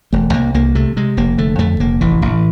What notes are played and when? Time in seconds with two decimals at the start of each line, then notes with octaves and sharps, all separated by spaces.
0.13 E1 A3
0.33 C2 A#3
0.54 C2 A#3
0.75 C3 A3
0.96 C3 G#3
1.17 F1 A#3
1.38 D3 A3
1.59 F2 A3
1.80 F1 A#3
2.01 A1 E3
2.22 A1